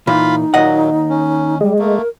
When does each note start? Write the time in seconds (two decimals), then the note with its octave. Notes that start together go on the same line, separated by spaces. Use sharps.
0.07 A#2 E3 D#4 F4 F5 B5
0.54 D#2 A#2 F#3 D#5 F#5
1.10 C#4
1.61 G3 G#3
1.79 A3 A#3 A#4